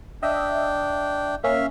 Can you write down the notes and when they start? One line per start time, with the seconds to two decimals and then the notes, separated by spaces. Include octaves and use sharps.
0.23 D4 D#5 E5 G5
1.44 A#3 C#4 E5 F5